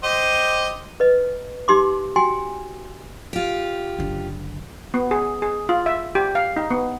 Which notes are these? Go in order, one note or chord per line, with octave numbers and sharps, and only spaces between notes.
G4 C5 D#5
B4 D#5
D#4 G4 C6 D6
F#4 G5 G#5 C6
F4 G4
F#1 D3
B3
G#4
G#4
F4
E5
G4
F5
D#4
B3